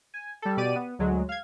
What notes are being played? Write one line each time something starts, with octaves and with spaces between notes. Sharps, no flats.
G#5
G3 A4
B2 G4 D5 D#7
B3
D2 F#3 G#3
F5 G#6